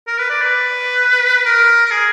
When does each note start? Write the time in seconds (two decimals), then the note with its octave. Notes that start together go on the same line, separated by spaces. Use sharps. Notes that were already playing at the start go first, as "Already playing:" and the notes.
0.08 A#4
0.18 B4
0.30 D5
0.42 B4
1.45 A#4
1.86 A#4
1.91 G#4